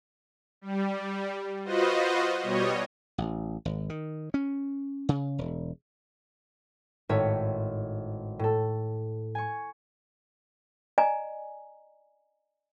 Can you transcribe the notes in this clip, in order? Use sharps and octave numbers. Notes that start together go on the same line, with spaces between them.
G3
F4 F#4 B4 C5 D#5
B2 G3 C#5 D#5
A1
G#1
D#3
C#4
C#3
E1
G#1 A2 C#5 E5 C#7
A2 A4
G#5 C#6
D5 D#5 G#5 A#5